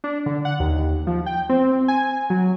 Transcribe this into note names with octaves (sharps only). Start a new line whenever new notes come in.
D4
D3
F#5
D#2
F3
G5
C4
G#5
F#3